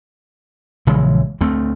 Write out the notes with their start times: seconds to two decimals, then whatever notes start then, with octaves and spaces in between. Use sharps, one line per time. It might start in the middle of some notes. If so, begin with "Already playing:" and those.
0.87 A#1 C#3 E3 G#3
1.41 D2 A3 C4